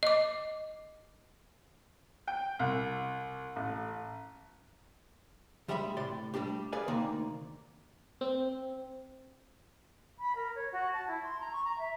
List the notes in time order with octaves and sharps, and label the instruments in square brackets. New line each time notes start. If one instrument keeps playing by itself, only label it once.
[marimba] D#5 D6
[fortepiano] G5
C2
A1
[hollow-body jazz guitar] D2 G3 G#3 E5 B5
A2 C3 D5 C6
G3 A3 D4 G4
G#4 B4 D5 F5 G#5
D2 C3 D#3 A#3 D5
[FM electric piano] C4
[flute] B5
A#4
C#5
F#4
A5
E4
C6
A#5
C#6
A#5
E5